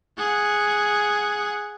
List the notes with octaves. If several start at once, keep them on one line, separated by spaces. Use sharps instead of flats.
G#4 F#5